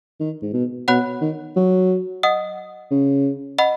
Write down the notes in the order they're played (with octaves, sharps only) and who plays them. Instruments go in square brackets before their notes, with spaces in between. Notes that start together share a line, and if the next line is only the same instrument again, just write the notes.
[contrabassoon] D#3
G#2
B2
[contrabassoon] B2 [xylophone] C#5 F#5 B5 F#6
[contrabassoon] D#3
F#3
[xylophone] D#5 F#5 D#6
[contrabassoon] C#3
[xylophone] D#5 F#5 B5